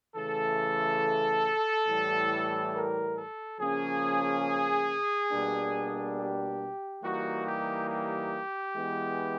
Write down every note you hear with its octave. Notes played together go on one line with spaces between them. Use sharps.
C#3 E3 A3 A4
A2 E3 G3
A#4
A4
C#3 F3 A#3 C#4 G#4
B2 G3 A#3 D4
G4
E3 G3 A#3 D#4 F#4
G4
G4
E3 G#3 B3